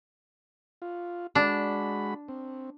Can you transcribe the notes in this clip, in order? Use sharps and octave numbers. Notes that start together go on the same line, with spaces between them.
F4
G#3 D4 F#4 B5
C4